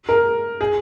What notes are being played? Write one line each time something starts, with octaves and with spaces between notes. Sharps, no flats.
A#4
G#4